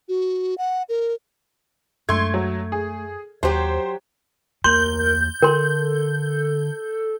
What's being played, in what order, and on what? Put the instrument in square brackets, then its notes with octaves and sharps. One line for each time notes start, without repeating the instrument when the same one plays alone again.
[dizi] F#4
F#5
A#4
[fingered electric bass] F#2 G#3 D4 [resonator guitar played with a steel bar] A3 [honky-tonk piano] C6 G#6
[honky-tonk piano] F#3
G#4
[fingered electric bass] D#2 [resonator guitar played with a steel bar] F#3 G4 [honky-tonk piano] C5
[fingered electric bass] E2 A#3 [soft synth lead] A#4 [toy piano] C6 [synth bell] G6
[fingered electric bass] D3 [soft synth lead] A4 [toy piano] A#4 C6